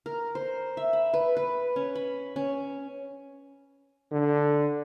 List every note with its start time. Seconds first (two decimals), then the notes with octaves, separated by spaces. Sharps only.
0.06 A#4
0.35 C5
0.77 E5
0.93 B5
1.14 B4
1.37 B4
1.76 C#4
1.95 B5
2.36 C#4
4.12 D3